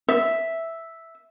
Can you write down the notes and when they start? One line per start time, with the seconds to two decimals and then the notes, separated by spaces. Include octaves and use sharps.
0.09 E5